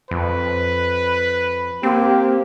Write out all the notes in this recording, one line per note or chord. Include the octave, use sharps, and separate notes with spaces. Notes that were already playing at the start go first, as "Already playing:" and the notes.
F2 B4
A#3 C4 G4